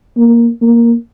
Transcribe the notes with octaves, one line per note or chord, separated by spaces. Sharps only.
A#3
A#3